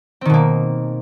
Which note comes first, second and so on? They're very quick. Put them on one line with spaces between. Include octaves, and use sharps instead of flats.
C4 D#3 B2 A#3